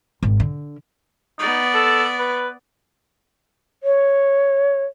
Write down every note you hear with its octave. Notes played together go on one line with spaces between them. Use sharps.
G#1
D3
B3 D#4 D5
A4
B4
C#5